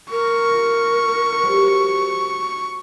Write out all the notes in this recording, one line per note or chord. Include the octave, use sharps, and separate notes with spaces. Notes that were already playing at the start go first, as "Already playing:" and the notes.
A#4 C#6
A3 F4
G3 F#4 C5